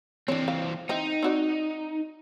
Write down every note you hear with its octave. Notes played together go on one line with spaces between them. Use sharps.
E3 C4 D4 C#5
F5
C4 D#4 E4
C4 F#4 D5